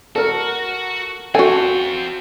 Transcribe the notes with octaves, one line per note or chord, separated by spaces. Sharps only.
F#4 A4 A#4
C4 F4 F#4 A4 G#5